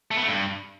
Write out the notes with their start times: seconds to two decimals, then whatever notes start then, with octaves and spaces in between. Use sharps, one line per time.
0.11 A3
0.17 B3
0.22 A3
0.28 G2